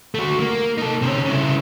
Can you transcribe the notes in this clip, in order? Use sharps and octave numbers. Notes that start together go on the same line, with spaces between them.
A3 F#4
A#3
D#4 A4
C3 C#4
C#3 E4